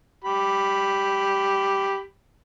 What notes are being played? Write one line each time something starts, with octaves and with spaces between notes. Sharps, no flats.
G4 B5